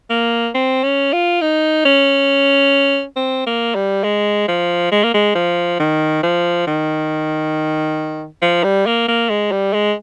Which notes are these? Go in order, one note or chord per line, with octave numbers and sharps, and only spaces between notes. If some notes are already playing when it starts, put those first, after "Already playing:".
A#3
C4
C#4
F4
D#4
C#4
C4
A#3
G3
G#3
F3
G#3
A#3
G#3
F3
D#3
F3
D#3
F3
G3
A#3
A#3
G#3
G3
G#3